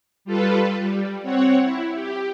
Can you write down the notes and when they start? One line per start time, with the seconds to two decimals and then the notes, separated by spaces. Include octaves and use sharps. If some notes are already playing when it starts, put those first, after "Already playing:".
0.25 G3 F4 A4 B4
0.79 G3
1.23 C4 C#5 F#5
1.64 E4
1.94 G4